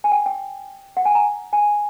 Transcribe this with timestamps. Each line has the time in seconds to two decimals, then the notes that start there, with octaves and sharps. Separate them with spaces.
0.04 G#5
0.12 G5
0.26 G5
0.97 F#5
1.05 G#5
1.15 A#5
1.53 G#5